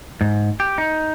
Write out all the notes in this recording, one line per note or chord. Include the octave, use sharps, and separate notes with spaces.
G#2
G4
D#4